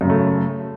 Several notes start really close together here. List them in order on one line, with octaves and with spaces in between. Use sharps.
F#2 C#3 A3